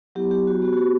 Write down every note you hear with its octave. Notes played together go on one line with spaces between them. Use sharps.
F#3 B3 E4 G4
G4
F#4
B3 F#4 G4
F#4
G4